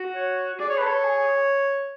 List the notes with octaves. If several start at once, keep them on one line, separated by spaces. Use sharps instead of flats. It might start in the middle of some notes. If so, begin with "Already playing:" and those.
Already playing: F#4
C#5
G#4 D5
C#5
A4 B4
C#5
G#4